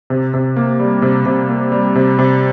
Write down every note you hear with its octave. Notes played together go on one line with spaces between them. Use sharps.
C3
C3
A#3
G3
C3
C3
A#3
G3
C3
C3